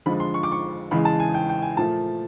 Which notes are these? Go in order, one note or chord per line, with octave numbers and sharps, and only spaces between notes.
F2 D3 F3 G#3 B5
C6
C#6
D6
C#6
E2 C#3 E3 G#3 B5
A5
G#5
G5
G5
G#5
A#2 F3 A3 A5